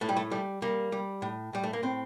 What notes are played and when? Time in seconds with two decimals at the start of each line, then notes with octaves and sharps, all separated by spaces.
0.01 A2 A3
0.09 G3
0.17 A3
0.31 G3 A3
0.62 G3 A#3
0.92 G3
1.22 A2
1.53 A2 G3
1.64 A3
1.73 A#3
1.83 A2 C4